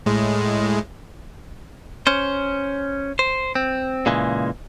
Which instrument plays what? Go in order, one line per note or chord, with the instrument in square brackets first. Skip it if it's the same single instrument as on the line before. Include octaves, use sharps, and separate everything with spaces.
[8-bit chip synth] A2 G#3
[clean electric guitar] C#4 C5
C5
C4
A#2 C#3 E3 G#3